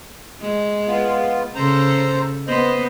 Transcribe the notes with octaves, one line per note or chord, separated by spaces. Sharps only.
G#3
B3 F4
C#3 A4 C5 A#5
B3 C5 D#5